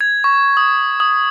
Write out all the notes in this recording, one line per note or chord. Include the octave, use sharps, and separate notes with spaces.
G#6
C#6
D#6
D#6